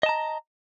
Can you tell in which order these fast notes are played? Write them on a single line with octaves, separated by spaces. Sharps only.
D#5 A5 A#5